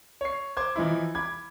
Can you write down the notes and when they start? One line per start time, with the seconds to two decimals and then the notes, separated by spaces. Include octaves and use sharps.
0.21 C#5 C7
0.57 C5 C6 D6 G#6
0.76 E3 F3 D#4 E4
1.15 B5 D6 G#6